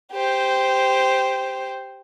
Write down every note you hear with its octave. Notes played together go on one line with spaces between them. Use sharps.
G4 C5